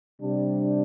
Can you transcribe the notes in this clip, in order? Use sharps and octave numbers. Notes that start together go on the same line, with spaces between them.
C3 G3 D4